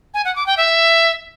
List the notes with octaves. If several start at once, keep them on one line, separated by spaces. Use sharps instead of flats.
G#5
F#5
D6
G5
E5